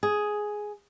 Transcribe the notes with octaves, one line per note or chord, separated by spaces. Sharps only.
G#4